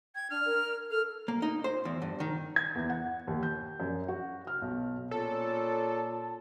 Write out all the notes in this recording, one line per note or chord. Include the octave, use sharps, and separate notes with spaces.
G5 G#6
D4 F6
A#4
A4 F6
A#3
D#4
C5
E2
G2
D#3
G#6
E2
F#5
D#2
G6
F#2
F#4
F6
B1
A#2 C#4 A4 A5